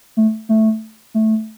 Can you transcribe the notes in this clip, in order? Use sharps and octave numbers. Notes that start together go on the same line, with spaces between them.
A3
A3
A3